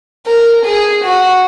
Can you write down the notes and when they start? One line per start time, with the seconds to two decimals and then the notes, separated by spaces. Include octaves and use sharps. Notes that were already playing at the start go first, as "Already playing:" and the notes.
0.26 A#4
0.65 G#4
1.04 F#4